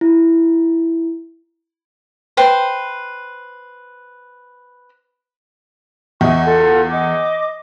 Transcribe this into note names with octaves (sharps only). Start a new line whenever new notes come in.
E4
B4 C5 G5
E2 D#5 E5 C#6
F4 A4
D#5 D6